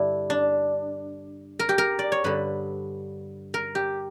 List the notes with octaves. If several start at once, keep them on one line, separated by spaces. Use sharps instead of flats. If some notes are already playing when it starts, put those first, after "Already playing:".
Already playing: G2 D3 D4 E4
D4
A#4
G4
A#4
D5
C#5
G2 D3 B4
A#4
G4